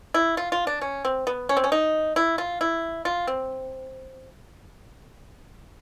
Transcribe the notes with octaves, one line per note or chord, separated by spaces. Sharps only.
E4
F4
F4
D4
C#4
C4
B3
C#4
C4
C#4
D#4
E4
F4
E4
F4
C4